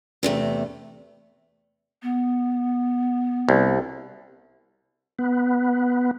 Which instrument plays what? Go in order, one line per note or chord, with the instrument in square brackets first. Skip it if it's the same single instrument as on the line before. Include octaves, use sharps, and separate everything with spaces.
[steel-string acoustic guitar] E2 C3 A3
[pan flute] B3
[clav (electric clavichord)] C2
[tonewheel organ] B3